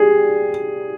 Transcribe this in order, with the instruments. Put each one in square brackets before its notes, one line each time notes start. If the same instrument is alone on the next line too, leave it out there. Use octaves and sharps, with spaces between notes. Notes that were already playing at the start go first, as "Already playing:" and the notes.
Already playing: [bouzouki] G3 G4 [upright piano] G#4